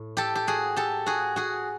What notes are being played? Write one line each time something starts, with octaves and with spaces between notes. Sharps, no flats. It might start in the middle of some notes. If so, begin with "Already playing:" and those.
Already playing: A2
G4 A4
G4
F#4 G#4
G4 A4
F#4 G#4
F#4 G#4